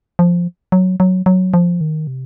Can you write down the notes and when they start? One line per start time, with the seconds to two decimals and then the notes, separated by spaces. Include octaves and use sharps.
0.19 F3
0.72 F#3
1.00 F#3
1.26 F#3
1.54 F3
1.81 D#3
2.07 C3